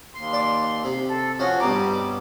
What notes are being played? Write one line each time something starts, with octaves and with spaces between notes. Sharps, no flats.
D#2 C6
D5
C3
A4
F3 C#4 F#4
G2 B2 G3 A#5 D6